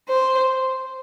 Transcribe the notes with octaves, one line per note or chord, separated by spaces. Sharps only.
C5